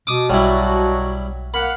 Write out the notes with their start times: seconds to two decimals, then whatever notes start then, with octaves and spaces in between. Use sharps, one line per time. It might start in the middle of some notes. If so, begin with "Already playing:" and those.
0.07 B2 D6 D#6
0.30 B1 F#3 G3 E4
1.54 A#3 F5 F#5 B5